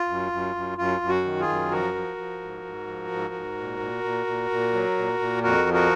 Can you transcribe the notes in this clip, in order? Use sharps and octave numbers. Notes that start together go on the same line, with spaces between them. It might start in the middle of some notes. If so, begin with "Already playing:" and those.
Already playing: F4
F#2
F#2
F#2
F#2 F4
F#2
F#4
D#3
F4 G#4
F#2
F3 F#4 A#4
F3
F3
G#2
G#2
F3
G#2
G#2
A#2
A#2
A#2
A#2
A#2
F#3
A#2
A#2
F2 F#4 A#4
F3
F#4 A#4